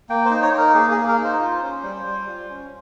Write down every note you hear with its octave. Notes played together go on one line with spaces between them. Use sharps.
A#3 G5
C5
D#4
C#5
D#4
A#4
A#3 G#4
G#4
A#3
A#4
D#4
C5
F4
C#4
G3
G3
F4
C#4